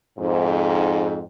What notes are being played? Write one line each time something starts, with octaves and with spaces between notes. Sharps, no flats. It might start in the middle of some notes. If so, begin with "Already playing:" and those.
F2 G#2